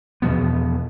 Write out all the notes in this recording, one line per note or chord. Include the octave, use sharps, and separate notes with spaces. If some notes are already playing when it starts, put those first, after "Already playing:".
E2 B2 F3 B3